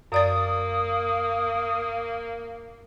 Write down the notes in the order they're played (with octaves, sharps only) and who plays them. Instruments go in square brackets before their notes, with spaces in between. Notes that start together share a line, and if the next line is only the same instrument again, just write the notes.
[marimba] F#2 D5 A6 [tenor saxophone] A#3 [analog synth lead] D#6